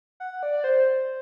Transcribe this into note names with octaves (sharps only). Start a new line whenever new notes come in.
F#5
D5
C5